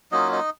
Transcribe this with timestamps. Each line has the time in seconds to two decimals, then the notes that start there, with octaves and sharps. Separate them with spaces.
0.12 F#3 A#3 C#4 D#4 F4 D#5
0.32 D#4 D#5